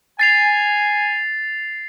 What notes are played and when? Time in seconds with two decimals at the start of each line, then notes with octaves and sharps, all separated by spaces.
0.19 G#5 A6 C7 F7